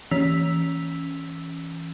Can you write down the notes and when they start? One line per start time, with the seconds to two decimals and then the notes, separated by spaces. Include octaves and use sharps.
0.11 E3 C#4 E6 B6 F7